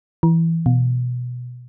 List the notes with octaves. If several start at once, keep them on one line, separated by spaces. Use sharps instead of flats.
E3
B2